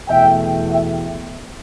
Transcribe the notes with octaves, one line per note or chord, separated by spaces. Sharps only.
E2 B2 A3 E5 G5
E5 G5